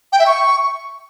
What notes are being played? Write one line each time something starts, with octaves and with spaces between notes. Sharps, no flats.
G5
E5
C#6